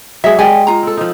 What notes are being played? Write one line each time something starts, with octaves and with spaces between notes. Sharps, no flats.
F#3 G#3 G#4 E5
G#3 G4 D5 G#5
F4 A#5
C4 A4
F3 D#4